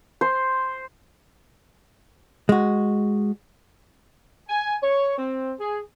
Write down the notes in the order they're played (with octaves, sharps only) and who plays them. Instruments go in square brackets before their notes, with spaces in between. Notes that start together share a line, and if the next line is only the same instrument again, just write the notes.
[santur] C5
[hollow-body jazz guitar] G#3 F#4
[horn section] G#5
C#5
C4
G#4